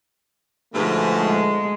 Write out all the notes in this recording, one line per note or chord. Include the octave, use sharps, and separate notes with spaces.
G#2 B2 D3 F3 A3
G#3